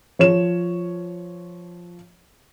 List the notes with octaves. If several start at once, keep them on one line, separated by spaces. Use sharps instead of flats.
F3 C#5 E7